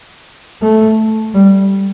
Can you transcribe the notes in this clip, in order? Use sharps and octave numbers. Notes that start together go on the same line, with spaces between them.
A3
G3